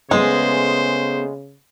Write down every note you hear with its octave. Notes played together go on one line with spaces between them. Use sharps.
C#3 G#3 A3 B3 G#4 C5